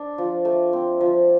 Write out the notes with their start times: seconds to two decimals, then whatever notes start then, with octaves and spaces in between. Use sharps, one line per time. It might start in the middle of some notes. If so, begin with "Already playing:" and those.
Already playing: D4
0.18 F3
0.45 A3
0.73 C4
1.01 F3